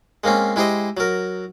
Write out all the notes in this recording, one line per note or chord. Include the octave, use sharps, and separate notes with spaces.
G#3 A#3 C4 C#4
G#3 E4 G4 C5 D#5
F#3 A#4